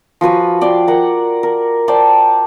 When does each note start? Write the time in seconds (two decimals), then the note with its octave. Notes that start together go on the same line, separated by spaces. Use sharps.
0.21 F3 F#4 B4 G#5
0.61 D5 G5 C6
0.88 A#4 F#5
1.43 A#4
1.88 C5 D5 G5 A5